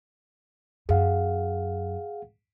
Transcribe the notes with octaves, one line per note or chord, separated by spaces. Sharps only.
F#2 G#4 F5 F#5